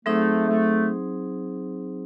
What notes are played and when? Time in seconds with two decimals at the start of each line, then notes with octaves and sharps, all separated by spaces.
0.05 F#3 A3 C4 D#4 G#4 C5
0.47 A3